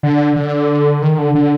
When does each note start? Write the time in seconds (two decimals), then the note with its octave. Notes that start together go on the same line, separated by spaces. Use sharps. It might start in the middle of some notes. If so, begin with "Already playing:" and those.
0.03 D3
0.36 D3
1.02 D#3
1.18 D3
1.35 D3